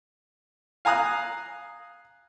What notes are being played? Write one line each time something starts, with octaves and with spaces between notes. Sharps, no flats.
F5 G#5 A#5 D#6 F#6